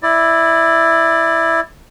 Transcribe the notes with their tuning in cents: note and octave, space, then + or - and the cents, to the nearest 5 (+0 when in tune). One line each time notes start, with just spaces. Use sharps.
E4 +0 D5 +20